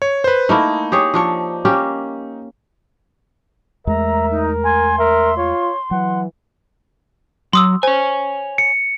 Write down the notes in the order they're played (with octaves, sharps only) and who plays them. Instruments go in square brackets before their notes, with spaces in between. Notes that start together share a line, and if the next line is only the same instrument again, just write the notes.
[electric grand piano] C#5
B4 C5
[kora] A3 A#3 E4 [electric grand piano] D#4
[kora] G4 G#4 C#5
F3 D4 C#5
A#3 C#4 G4
[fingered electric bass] E2 G#3 A3 [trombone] A#4 [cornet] E5 [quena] A#5
[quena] D#4
[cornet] G#5 [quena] C6
[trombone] A#4 [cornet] E5
[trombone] F4 [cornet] C#5
[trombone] E3 [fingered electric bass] F#3 [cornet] F#5
[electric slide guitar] F#3 [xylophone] C6 D#6 E6
[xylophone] C5 [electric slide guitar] C#5 G#5
[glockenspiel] C#7